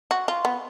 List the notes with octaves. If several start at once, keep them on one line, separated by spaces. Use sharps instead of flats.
F#4
F4
B3